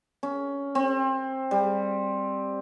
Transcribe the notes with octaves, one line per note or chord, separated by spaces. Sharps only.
C#4
C4
G3